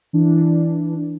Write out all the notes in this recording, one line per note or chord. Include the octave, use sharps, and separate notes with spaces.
E3 D4